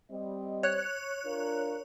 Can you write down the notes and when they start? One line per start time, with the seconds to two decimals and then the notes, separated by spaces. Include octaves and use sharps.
0.11 G3 C4 D#5
0.63 C#5 F#6
1.26 D4 F4 A#4